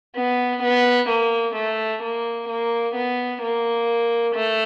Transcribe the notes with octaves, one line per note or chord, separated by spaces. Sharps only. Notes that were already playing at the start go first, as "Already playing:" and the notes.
B3
B3
A#3
A3
A#3
A#3
B3
A#3
A3